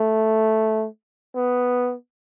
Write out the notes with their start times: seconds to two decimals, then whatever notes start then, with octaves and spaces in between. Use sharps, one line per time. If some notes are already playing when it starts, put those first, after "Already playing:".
Already playing: A3
1.36 B3